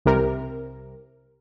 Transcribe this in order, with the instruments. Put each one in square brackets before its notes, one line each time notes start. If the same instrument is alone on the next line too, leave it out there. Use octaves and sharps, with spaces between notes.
[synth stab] C2 C3 A#4